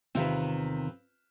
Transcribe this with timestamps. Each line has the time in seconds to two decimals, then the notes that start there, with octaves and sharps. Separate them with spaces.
0.15 E2 C3 D#3 C4 F4 B4